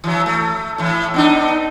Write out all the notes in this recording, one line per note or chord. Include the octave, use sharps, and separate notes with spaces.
E3 F#3
A3
A2 E3
B3 D4 D#4